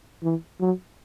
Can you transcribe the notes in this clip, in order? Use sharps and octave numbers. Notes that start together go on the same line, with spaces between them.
E3
F#3